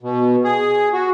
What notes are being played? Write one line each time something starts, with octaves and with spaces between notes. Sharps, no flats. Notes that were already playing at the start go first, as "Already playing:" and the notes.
B2
G#4
F#4